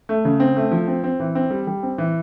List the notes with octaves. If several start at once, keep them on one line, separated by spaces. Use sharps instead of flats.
A3
C#3
C4
A3
F3
C4
C4
E3
C4
G3
G3
C4
E3